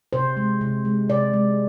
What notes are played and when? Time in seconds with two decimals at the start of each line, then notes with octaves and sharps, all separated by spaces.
0.13 C3 C5
0.37 G#3
0.61 C3
0.85 G#3
1.09 C3 D5
1.34 G#3